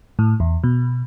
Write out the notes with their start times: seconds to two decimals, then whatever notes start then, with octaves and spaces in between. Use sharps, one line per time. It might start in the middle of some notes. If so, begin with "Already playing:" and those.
0.19 A2
0.40 E2
0.64 B2